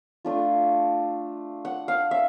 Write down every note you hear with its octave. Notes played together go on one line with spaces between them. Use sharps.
A3 D4 F4
F#5
F5
E5